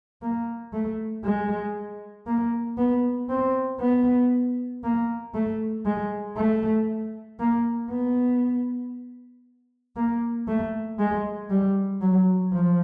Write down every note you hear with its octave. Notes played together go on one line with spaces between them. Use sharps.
A#3
A3
G#3
A#3
B3
C4
B3
A#3
A3
G#3
A3
A#3
B3
A#3
A3
G#3
G3
F#3
F3